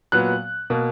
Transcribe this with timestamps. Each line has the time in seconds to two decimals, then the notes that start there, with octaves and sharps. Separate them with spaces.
0.12 A#2 F#3 B3 F#6
0.70 B2 A#3